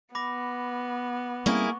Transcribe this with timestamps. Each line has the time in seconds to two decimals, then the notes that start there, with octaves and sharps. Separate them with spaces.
0.15 B3 B5 D6 A#6
1.46 G3 A#3 C4 C#4 E4 G#4 C#6